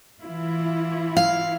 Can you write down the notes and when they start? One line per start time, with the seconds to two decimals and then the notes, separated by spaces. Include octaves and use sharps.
0.20 E3 E4 F4
1.17 F5